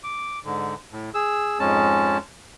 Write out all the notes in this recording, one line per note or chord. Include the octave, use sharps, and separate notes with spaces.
D6
G#2 D3
A2
G#4 E6
F2 G#2 G#3 C#4 A5